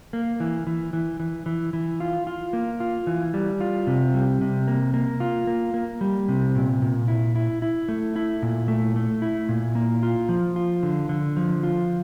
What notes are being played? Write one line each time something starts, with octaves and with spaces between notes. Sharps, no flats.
A#3
E3
E3
E3
E3
E3
E3
F4
F4
A#3
F4
E3
G3
F4
C3
G3
C3
A#3
A#3
F4
A#3
A#3
G3
C3
A#2
A#2
E4
E4
E4
A3
E4
A#2
A3
A3
E4
A#2
A#3
F4
F3
F4
D3
D3
F3
F4